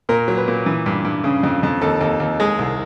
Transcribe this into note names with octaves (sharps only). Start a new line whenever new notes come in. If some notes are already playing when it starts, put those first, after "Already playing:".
A#2 A#4
F#3
B4
A#2
E3
G2
G2
C#3
F2
F2
D#2 A4
D#2
D#2
G#3 G#4
C2